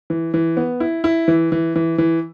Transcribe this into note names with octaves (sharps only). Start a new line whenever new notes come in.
E3
E3
B3
E4
E4
E3
E3
E3
E3